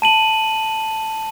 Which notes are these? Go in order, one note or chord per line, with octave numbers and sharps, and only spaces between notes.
A5 D#7 F#7